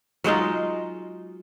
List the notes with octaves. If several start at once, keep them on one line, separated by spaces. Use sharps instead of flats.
F#3 G#3 D#4 F4